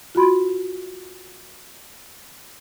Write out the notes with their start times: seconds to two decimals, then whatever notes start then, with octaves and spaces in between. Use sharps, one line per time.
0.15 F4 F#4 B5 C6